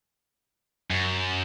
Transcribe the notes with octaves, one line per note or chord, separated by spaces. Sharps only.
F#2